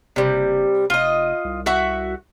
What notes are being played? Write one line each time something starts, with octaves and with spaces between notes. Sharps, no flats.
F#1 C3 G3
F1 F4 D#5
C2
F#4 E5 F#5